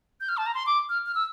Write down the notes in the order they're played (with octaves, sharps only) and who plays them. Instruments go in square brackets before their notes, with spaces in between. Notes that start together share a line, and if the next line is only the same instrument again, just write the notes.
[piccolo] G6
F6
A5
A#5
C6
D6
F6
F6
E6